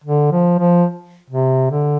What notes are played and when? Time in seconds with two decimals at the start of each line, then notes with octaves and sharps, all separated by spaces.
0.04 D3
0.32 F3
0.59 F3
1.30 C3
1.71 D3